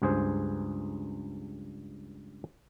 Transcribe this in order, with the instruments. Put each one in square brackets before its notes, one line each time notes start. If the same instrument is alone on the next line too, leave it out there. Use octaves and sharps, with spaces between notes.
[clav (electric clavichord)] C#2 G2 G#4 C5